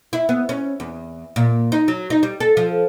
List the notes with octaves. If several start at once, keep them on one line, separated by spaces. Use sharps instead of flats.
E4
B3
C#4
E2
A#2
D#4
F#3
D#4
G3
A4
F3